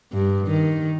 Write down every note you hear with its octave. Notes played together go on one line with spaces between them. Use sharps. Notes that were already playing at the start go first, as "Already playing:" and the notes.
G2
D#3